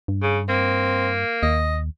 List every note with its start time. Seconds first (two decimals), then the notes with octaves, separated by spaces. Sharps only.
0.08 G2
0.22 C#3
0.49 A#3 C4
1.43 D#2 D#5